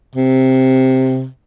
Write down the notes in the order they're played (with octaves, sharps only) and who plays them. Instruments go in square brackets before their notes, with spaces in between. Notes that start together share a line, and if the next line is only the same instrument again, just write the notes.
[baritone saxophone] C3